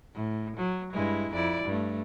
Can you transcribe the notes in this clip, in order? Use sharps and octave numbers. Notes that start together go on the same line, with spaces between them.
A2
F#3
G2 G#3 E4
F2 E4 D5
G2 A3